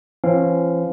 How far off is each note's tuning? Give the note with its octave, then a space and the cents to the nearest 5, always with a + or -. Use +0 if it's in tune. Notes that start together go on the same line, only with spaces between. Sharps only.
F3 -45 C#4 -45 F5 +0